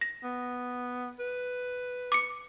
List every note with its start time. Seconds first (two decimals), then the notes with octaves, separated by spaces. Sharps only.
0.01 A#6
0.23 B3
1.19 B4
2.12 D6 C#7